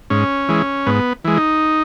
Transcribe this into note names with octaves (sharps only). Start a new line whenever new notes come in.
G#2 C#4
E3 G#3
G#2 B3
E3 G#3
D#4